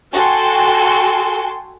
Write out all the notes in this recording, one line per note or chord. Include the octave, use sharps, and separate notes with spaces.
F#4 A4 G5 G#5 C6